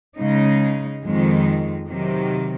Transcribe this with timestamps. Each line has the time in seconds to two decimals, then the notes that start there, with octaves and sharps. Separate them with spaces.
0.18 C#3 G#3 D#4
1.03 F2 D#3 G#3
1.88 C3 D#3 F#3